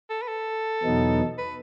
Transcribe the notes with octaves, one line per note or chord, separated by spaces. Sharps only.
A4
B4
A4
E2 B2 F#3 B3 D#4
B4